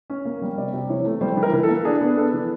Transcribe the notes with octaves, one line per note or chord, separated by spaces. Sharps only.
C#4
A#3
G3
C3 D5
C3
E3 C#5
A3
G3 C5
E3
A#4
E3
A4
A#3
D4 G#4
B3
B3 A4
E3